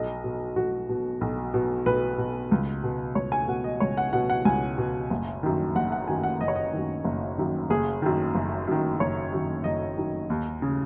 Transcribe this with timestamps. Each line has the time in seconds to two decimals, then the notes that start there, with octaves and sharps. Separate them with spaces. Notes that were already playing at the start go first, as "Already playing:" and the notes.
Already playing: B1 D#5
0.24 B2
0.56 B1 F#4
0.89 B2
1.21 B1
1.54 B2
1.86 B1 B4
2.18 B2
2.51 C#2
2.83 B2
3.15 C#2 C#5
3.32 G#5
3.48 B2 F#5
3.64 D#5
3.80 C#2 C#5
3.97 F#5
4.13 B2 F#5
4.30 F#5
4.45 C#2 G#5
4.78 B2
5.10 F#1
5.43 F#2 D#3
5.75 F#1 F#5
5.92 F#5
6.08 F#2 D#3 G#5
6.23 F#5
6.40 F#1 D#5
6.48 C#5
6.56 D#5
6.73 F#2 D#3
7.04 F#1
7.38 F#2 D#3
7.70 F#1 G#4
8.02 F#2 D#3
8.34 F#1
8.67 F#2 D#3
9.00 F#1 C#5
9.33 F#2 D#3
9.64 F#1 D#5
9.97 F#2 D#3
10.30 D#2
10.62 C#3